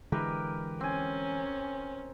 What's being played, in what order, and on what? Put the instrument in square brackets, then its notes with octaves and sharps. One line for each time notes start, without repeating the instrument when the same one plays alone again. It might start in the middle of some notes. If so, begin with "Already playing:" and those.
[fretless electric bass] D3 E3 G#3 [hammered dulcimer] G4 A#4 B4
[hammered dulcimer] C4 G#5 [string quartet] C#4